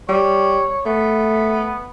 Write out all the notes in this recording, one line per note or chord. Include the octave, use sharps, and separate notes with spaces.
G3 C#5
A3 B3